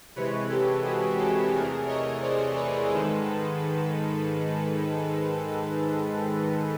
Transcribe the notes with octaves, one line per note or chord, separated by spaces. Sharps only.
C3 E3 G#3 B4 C#5
G4 A4
F#4 G#4
G4 A4
E2 C3 E3 A3 G#4 A#4
C#5 D#5
C5 D5
B4 C#5
G#2 D#3 G#3 A4 B4